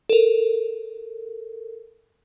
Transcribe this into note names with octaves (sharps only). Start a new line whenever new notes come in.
A4 A#4